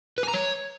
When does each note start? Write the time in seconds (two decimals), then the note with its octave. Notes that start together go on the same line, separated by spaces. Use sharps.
0.18 B4
0.23 G#5
0.28 A#5
0.34 C#5